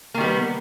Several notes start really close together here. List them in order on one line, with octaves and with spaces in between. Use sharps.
A#3 D#3 G3 B3